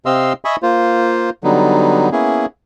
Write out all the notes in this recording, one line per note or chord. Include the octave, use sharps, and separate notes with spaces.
C3 C4 D#5 F5 C6 E6
D#5 E5 G#5 B5 C#6 D#6
A#3 F4 C5
D3 F#3 G3 B3 D#4
A#3 B3 C#4 E4 G#4